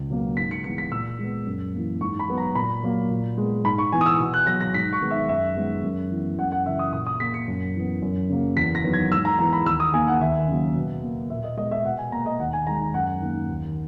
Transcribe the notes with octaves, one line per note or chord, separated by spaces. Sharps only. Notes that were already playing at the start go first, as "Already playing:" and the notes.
Already playing: C#2
B2 F#3 A#3
G#2 B6
C#7
E3 G#3 B3 C#7
B6
A#2 E6
G#3 B3
F#2
E3 A#3
G#2 C#6
B5
F#3 B3
A#5
A#2 B5
F#3 A#3
A#2
G#3 B3
G#2 B5
C#6
E3 B3 G#5
D#6
E6
B2
F#6
F#3 B3 A#6
A#6
G#2 B6
C#6
D#3 G#3 B3
E5
F#2 E5
D#3 G#3 B3
F#2
E3 B3
F#2 F#5
F#5
C#3 E3 E5
D#6
A#2 D#6
D#6
A#3 B6
C#7
F#2
E3 B3
F#2
C#3 F#3 A#3
E2 B6
A#6
D#3 F#3 B3
G#6
G#2 E6
A#5
E3 B3 A#5
B5
D#2 E6
D#6
D#3 A#3 G#5
F#5
D#2 E5
C#3 F#3 A#3
B2
A#3
A#2 E5
D#5
G#3 B3 D#5
E5
B2 F#5
G#5
A#3 A#5
D#5
D#2 F#5
G#5
D#3 G#3 A#5
F#2 F#5
D#3 A#3
D#2